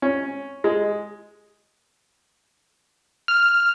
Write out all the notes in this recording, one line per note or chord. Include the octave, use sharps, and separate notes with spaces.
C#4
G#3
F6